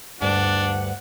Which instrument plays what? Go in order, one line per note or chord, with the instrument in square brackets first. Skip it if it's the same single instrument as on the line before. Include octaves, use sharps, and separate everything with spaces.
[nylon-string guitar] D2 G2 D5 [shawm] D4 [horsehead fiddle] F#5